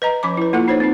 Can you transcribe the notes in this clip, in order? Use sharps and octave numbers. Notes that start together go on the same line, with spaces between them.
B4 D#5 A#5
F3 C#4 B5 D6
E4 B4
A#3 E4 F4 A4 F#5
D#4 C5 C#5
C4 D#4